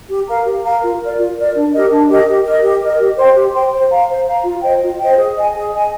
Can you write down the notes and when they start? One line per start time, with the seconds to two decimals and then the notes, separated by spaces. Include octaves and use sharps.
0.09 G4
0.27 A#4 F5 A#5
0.45 G4
0.63 A#4 F5 A#5
0.82 F4
1.00 A#4 D5
1.18 F4
1.36 A#4 D5
1.55 D4
1.72 G4 A#4 D#5
1.91 D4
2.08 G4 A#4 D#5
2.27 G4
2.45 A#4 D#5
2.63 G4
2.82 A#4 D#5
2.99 G4
3.18 C5 G5 C6
3.35 G4
3.54 C5 G5 C6
3.72 C5
3.90 F5 A#5
4.08 C5
4.27 F5 A#5
4.45 F4
4.62 C5 D#5 G5
4.81 F4
4.99 C5 D#5 G5
5.17 G#4
5.35 D#5 G#5
5.54 G#4
5.72 D#5 G#5